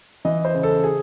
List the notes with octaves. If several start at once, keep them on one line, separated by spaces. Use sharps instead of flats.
E3 D#5
C5
C#3
A4
G#4